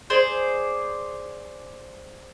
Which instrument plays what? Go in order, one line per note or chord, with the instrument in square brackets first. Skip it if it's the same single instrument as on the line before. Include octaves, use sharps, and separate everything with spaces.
[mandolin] G#4 C5 D5